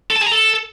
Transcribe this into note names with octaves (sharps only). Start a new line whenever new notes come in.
A4
A5
G#4
A#5
A4